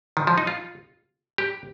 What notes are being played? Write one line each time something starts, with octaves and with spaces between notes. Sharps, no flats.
D#3
F3
D#4
F4
G4